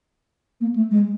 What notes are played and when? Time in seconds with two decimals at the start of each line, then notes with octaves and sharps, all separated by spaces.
0.60 A#3
0.75 A3
0.91 G#3